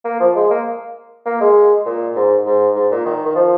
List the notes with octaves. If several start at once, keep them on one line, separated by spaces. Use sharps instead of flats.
A#3
F3
G#3
A#3
A#3
G#3
A#2
G#2
G#2
G#2
A#2
D#3
D#3
F3